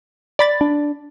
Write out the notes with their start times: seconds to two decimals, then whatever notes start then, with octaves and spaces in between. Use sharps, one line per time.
0.39 D5 B5 A6
0.61 D4